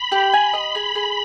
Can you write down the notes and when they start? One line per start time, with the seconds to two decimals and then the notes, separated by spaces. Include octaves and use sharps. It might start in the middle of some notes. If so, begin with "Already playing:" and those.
Already playing: B5
0.12 G4
0.33 G#5
0.53 D#5
0.75 G#4
0.95 G#4